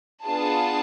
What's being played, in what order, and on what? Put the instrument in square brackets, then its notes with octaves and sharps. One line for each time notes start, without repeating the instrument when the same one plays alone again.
[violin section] B3 D4 F4 G#4 A5